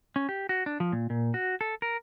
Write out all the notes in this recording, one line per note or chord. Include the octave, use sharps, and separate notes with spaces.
C#4
G4
F#4
D4
F3
A#2
A#2
F#4
A4
A#4